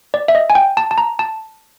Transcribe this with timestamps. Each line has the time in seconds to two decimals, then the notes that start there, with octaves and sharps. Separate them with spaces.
0.14 D5
0.28 E5
0.35 D#5
0.50 G#5
0.55 G5
0.77 A5
0.91 A5
0.98 A#5
1.19 A5